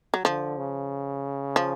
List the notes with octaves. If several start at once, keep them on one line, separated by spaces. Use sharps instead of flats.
F#3
D3 F3
C#3
F3